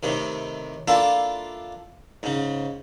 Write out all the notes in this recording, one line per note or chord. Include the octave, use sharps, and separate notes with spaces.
A2 C3 D#3
A#3 D4 E4 F4 A4
G#2 C#3